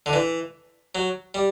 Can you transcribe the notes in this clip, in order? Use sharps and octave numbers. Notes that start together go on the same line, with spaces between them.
D3
E3
F#3
G3